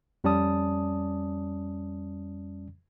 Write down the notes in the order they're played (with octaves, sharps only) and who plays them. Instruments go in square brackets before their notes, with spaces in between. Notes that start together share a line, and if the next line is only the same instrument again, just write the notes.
[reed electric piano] F2 G3 C#4 D5 A5 D#6